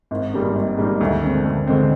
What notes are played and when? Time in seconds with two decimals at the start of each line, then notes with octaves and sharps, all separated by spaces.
0.11 G#1
0.33 G#2 G3 A#3 D#4
0.55 G#1
0.78 G#2 G3 A#3 D#4
1.01 D2
1.23 D3 G#3 C4
1.45 D2
1.67 D3 G#3 C4